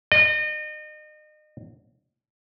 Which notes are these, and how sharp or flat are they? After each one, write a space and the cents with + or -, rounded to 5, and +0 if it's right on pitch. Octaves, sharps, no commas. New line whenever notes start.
D#5 -35